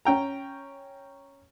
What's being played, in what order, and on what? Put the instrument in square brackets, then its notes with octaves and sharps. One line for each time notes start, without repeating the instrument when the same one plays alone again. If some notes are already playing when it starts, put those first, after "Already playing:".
[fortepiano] C#4 G5 A#5